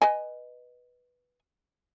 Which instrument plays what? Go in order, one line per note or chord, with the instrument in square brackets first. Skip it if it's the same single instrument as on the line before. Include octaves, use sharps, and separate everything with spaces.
[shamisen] B4 D#5 G#5